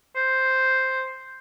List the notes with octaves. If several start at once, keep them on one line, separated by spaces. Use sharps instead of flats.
C5